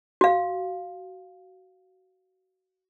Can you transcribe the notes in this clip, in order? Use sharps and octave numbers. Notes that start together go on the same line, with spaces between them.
F#4 F5